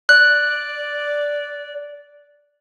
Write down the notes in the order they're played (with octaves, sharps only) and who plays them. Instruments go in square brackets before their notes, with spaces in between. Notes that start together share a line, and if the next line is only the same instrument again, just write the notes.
[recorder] D5 [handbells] F#6